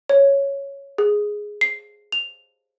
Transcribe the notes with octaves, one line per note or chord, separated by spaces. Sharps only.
C#5
G#4
C7
F7